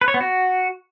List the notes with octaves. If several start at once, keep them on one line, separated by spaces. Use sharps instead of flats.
B4
C#5
B3
F#4